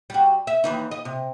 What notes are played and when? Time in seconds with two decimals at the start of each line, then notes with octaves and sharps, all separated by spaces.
0.10 G3 F#4
0.47 E5
0.64 D#2 E3 D#4
0.91 D#5
1.05 C3